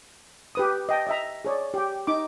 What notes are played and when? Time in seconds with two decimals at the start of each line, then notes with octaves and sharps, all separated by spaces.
0.55 G4 B4 D#6
0.89 D#5 G5 A5
1.07 D#5 E5 A#5
1.45 G#4 C#5 D5
1.74 G4 G5
2.07 D#4 D6